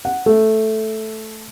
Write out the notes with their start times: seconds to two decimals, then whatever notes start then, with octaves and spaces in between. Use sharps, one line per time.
0.05 F#5
0.26 A3